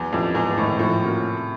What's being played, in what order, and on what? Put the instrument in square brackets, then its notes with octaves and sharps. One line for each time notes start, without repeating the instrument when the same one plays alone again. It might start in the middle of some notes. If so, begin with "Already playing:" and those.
Already playing: [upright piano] E2 [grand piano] F#3
[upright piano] F2 [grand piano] A3 C#4 E4 G4
[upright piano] E2 [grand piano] G#2
[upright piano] A2 [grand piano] D#3 G#3 C4 D#4
[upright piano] A2 [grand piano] F3
[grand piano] A#3 C#4 F#4 A#4
C3